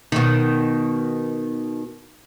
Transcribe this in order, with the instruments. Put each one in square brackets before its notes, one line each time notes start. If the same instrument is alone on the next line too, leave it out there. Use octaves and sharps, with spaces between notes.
[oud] B2 D#3